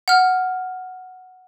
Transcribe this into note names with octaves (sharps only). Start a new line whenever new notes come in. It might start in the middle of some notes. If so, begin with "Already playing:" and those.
F#5 F6